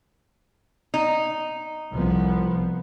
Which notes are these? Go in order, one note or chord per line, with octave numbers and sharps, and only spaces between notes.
D#4
C2 F3 B3